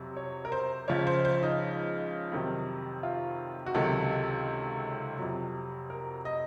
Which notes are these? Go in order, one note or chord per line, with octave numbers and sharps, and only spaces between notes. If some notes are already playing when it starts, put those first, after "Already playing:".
Already playing: F2 C3 F#3
C#5
A#4
C5
C#2 C#3 F3 C#5
C5
C5
D#4
F2 C3 D#3 F#3
F4
F#4
C#2 C3 D#3 F#3 A4
F2 C3 F#3
A#4
D#5